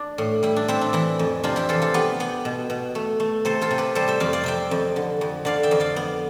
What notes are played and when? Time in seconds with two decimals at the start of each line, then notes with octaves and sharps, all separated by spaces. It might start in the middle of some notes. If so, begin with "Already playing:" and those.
Already playing: D4
0.18 A2
0.43 G3 E4
0.56 D4
0.68 C4 E4
0.81 D4
0.93 E3 E4
1.19 F2
1.43 C3 D4 F4
1.56 E4 G4
1.69 E3 F4 A4
1.82 F4 A4
1.94 B3 G4 B4
2.20 B3
2.45 B2
2.70 B2
2.95 A3
3.20 A3
3.45 C3 A4 C5
3.61 F4 A4
3.71 C3
3.78 G4 B4
3.95 G3 A4 C5
4.08 C5 E5
4.20 F2 D5 F5
4.33 D5 F5
4.44 C3 E5 G5
4.71 F2
4.96 D3
5.21 F2
5.45 D3 D5 F5
5.63 E5 G5
5.71 F2
5.80 D5 F5
5.96 B3